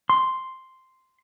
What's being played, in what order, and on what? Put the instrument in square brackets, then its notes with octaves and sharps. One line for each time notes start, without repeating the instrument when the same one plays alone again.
[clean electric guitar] C6